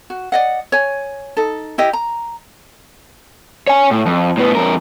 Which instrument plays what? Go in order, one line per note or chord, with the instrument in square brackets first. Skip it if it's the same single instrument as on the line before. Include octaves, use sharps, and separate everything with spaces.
[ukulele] F#4
D5 D#5 F#5
C#5 G#5
D#4 A4
E4 G4 D#5
A#5
[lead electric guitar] C#5 G#5
A2
F2
A2 B3
F2 A#4